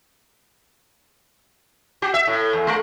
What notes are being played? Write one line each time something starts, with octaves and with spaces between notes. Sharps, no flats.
F#4
E5
A2
E2
G#3